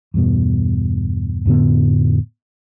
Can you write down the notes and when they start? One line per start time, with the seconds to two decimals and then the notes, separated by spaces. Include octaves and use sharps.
0.14 E2 G2 B2
1.46 F2 A2 D3 B3